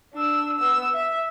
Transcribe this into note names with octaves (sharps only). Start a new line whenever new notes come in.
D4 E6
B3 E6
E5